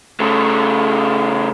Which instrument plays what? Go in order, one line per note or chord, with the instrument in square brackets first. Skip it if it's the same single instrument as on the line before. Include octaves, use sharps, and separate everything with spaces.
[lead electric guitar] C#3 A3